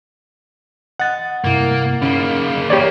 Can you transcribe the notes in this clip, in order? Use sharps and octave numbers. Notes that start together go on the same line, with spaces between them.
D#5 F#5 A6
G2 C3 A#3 E4
C#3 A#3 C#4 D#4
E3 A#3 G4 C#5 D5